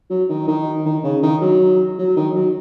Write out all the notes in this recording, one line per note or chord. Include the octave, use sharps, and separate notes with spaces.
F#3
D#3
D#3
D#3
C#3
D#3
F#3
F#3
D#3
F#3